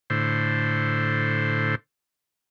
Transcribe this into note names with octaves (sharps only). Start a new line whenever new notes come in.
A2 D3 C5